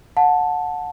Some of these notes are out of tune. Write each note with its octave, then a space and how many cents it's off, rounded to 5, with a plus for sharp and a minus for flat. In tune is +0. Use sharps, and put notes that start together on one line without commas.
F#5 -20 A5 +0